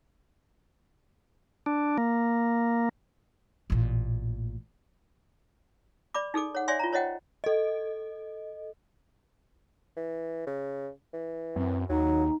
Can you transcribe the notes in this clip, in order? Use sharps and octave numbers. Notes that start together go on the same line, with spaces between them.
D4
A#3
A1 A#2
D5 B5 D6
D#4 G#4 A4 D6
C#5 F#5
C#5 D5 E5 G#5 C6
F4 A#5
C5 C#5 D#5 F#5 G5
A4 D#5
E3
C#3
E3
F#2 C4
D#2 F#3 D#4